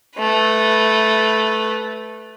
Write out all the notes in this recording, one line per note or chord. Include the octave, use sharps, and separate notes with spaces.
A3 B4